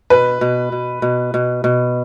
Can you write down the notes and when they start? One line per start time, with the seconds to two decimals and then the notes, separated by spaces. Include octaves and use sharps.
0.10 B2 B4
0.41 B2
0.72 B2
1.02 B2
1.34 B2
1.64 B2